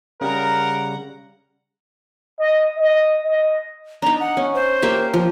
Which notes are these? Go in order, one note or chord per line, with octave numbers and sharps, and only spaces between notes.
C#3 G3 A#4 F#5 A#5
D#5
D#5
D#5
D4 D#4 A#5
F#5
C#4
C5
A#3 G4 E5
F3